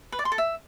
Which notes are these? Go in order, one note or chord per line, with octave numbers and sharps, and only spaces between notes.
B4
D5
C6
A4
E5